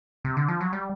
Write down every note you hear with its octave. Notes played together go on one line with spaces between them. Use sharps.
C3
D3
F3
F#3
G3